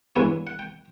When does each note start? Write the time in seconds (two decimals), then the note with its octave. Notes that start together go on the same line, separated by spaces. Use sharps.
0.16 G2 E3 G#3 B3 E4 C#5
0.47 F#5
0.59 G5